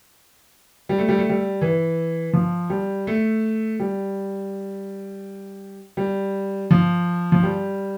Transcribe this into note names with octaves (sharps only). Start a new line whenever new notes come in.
G3
A3
G3
A3
G3
E3
F3
G3
A3
G3
G3
F3
F3
G3